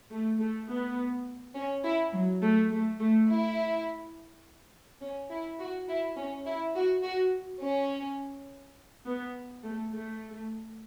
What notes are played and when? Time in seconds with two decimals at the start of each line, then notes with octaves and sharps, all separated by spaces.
0.11 A3
0.40 A3
0.68 B3
1.55 C#4
1.84 E4
2.13 F#3
2.42 A3
2.71 A3
3.00 A3
3.28 E4
5.01 C#4
5.30 E4
5.59 F#4
5.88 E4
6.17 C#4
6.46 E4
6.75 F#4
7.03 F#4
7.61 C#4
9.05 B3
9.63 A3
9.92 A3